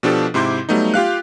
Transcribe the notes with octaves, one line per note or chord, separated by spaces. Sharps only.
B2 F3 D4 F4 G4 A4
G#2 C3 E4 C6 D6 G6
F#3 G3 A3 B3 D#4
F4 G4 F5 F#6